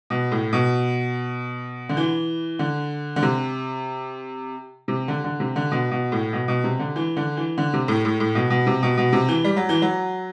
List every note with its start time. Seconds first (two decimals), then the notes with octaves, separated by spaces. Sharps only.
0.10 B2
0.32 A2
0.53 B2
1.89 D3
1.97 E3
2.59 D3
3.16 D3
3.22 C3
4.88 C3
5.08 D3
5.24 D3
5.40 C3
5.56 D3
5.71 B2
5.91 B2
6.12 A2
6.33 B2
6.48 B2
6.64 C3
6.79 D3
6.96 E3
7.17 D3
7.37 E3
7.58 D3
7.73 C3
7.88 A2
8.05 A2
8.20 A2
8.35 B2
8.50 B2
8.66 C3
8.83 B2
8.97 B2
9.13 C3
9.28 E3
9.44 G3
9.56 F#3
9.69 E3
9.82 F#3